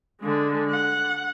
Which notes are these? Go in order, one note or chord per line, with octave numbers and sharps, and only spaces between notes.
D3 G#3
F#5